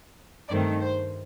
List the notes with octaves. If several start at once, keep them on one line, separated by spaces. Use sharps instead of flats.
G2 D#3 A3 C4 D5
C5